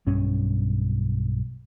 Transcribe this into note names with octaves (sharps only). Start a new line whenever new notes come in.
B1 G2 C#4